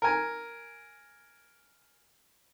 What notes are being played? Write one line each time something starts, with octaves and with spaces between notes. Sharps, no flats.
A#4 G#5